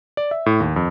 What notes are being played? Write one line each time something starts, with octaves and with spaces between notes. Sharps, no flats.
D5
E5
A2
D#2
F2